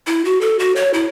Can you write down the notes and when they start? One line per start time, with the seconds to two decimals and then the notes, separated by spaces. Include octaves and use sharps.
0.07 E4
0.25 F#4
0.41 A4
0.59 F#4
0.76 C#5
0.94 E4